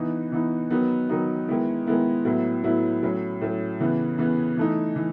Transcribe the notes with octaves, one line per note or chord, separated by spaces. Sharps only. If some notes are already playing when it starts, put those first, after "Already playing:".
Already playing: E3 B3 D#4
E3 B3 D#4
D#3 F#3 B3 D#4
D#3 F#3 B3 D#4
D#3 G#3 B3 E4
D#3 G#3 B3 E4
A2 F#3 B3 E4
A2 F#3 B3 E4
A2 F#3 C#4
A2 F#3 C#4
C#3 E3 B3
C#3 E3 B3
E3 A3 D#4
E3